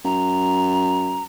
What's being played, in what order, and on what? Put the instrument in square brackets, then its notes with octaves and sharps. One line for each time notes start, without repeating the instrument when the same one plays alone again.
[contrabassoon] F#2 [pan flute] A#5